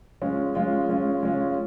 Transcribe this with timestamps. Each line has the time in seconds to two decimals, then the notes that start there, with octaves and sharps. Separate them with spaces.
0.22 G#3 C#4 F4
0.55 G#3 C#4 F4
0.89 G#3 C#4 F4
1.23 G#3 C#4 F4